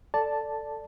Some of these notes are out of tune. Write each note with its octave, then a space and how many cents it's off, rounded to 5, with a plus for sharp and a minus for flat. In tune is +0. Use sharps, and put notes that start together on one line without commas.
A4 +10 D5 +0 A5 +0